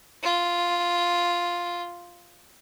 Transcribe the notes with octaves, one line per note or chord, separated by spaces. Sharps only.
F4